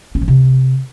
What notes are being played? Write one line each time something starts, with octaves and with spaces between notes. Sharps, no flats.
C#4
F3
C3